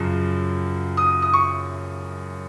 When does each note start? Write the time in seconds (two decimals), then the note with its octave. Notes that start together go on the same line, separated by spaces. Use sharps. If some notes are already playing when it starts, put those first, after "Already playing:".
Already playing: F#2 C#3 F3
0.97 D#6
1.22 D#6
1.34 C#6